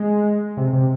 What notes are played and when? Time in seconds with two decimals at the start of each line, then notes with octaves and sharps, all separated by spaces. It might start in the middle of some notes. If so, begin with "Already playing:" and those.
Already playing: G#3
0.57 C3
0.73 C3